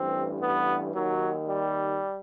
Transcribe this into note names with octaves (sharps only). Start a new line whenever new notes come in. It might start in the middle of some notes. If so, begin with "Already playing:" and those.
Already playing: A1 G2 E3 C4
B3
D#2 D#3 F#3
G3